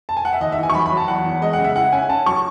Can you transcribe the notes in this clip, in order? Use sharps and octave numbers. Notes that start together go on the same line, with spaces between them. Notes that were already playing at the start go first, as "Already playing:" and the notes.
A5
G#5
F#5
E5
D#2 D#5
E3 E5
G#5
C#6
F#3 B5
B5
F#3
A5
E2 F#5
E2
G#3 D#5
F#5
C#3
E5
E4 F#5
C#4 G#5
C#4 A5
F#3 C#6